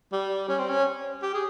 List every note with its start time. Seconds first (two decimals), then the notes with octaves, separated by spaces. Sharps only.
0.13 G3
0.49 C#4
0.59 C4
0.69 C#4
1.22 G4
1.34 G#4